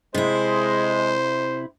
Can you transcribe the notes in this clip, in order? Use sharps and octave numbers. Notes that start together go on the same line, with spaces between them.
C3 G#3 E4 C5